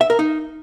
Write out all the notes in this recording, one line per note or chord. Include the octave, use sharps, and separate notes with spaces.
E5
A#4
D#4